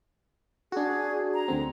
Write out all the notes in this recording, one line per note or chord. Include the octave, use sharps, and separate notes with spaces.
D4 F#4 G#4
A#5
D2 D3 C4